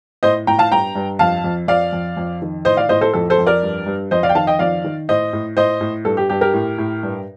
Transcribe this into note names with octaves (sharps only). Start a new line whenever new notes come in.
A2 C5 D#5
A2 G5 A#5
F5 A5
G2 G5 A#5
G2
F2 F5 A5
F2
F2 D5 F5
F2
F2
D#3
A2 C5 D#5
D5 F5
A2 C5 D#5
A4 C5
F2 A4
A4 C5
F2
A#4 D5
G2
G2
F2 C5 D#5
D5 F5
G5
D#3 F5 A5
D#5 G5
F2 D5 F5
D#3
A2 C5 D#5
A2
A2 C5 D#5
A2
G2 A4
G4
G2 G4
G4 A#4
A2
A2
G2